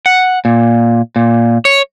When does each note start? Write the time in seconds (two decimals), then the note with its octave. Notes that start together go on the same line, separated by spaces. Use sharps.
0.06 F#5
0.45 A#2
1.16 A#2
1.65 C#5